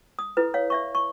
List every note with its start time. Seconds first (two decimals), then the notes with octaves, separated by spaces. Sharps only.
0.19 D#6
0.37 E4 A4 B4
0.54 C#5 F5
0.70 D5 E5 C#6
0.95 C#6